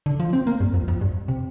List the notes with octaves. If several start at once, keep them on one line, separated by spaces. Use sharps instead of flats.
D3
F3
C4
A#3
G2
F2
F2
G2
C3